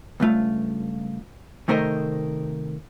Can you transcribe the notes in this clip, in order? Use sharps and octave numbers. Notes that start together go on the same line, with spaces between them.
C#2 G2 A3 F4
C3 D#3 A3 A#4 C5 D#5